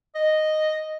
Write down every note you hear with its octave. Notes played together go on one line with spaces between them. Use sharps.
D#5